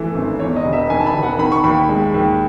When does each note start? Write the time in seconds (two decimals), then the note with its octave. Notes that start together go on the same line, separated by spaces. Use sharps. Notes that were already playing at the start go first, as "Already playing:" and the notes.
Already playing: F#2 E3 A3
0.14 G#1
0.39 E2 C#5
0.56 D#5
0.64 E1
0.73 E5
0.90 D#3 G#5
1.00 A5
1.06 B5
1.14 E1
1.23 F#5
1.39 D#3 B5
1.52 C#6
1.64 D#2 B5
1.89 G#3
2.14 D#2